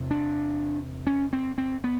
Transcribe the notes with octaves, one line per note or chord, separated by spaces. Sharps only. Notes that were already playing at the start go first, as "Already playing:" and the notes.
Already playing: E2 C3
D4
C#4
C4
C4
B3